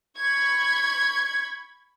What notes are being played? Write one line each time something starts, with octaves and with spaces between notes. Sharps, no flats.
B5 C#6 G#6